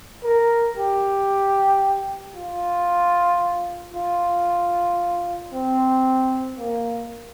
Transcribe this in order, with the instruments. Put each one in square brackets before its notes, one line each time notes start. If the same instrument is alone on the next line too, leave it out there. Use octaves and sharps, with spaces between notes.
[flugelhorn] A#4
G4
F4
F4
C4
A#3